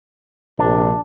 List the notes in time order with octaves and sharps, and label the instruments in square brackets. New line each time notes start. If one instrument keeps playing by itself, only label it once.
[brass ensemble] A#1 C3 [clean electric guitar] D4